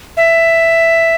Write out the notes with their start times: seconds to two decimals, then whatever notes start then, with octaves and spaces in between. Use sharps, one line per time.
0.17 E5